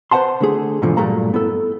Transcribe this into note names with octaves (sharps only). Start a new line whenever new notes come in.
B4 C5 D5 F#5 A5 C6
D3 A3 G#4
G#2 B2 D3 E3 F3
G2 A#2 F#3 A3 A#3 A#5
B3 E4 A4